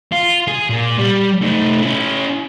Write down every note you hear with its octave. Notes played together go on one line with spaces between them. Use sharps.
F4
G#4
A#2
G3
A3 D#4
C#4 E4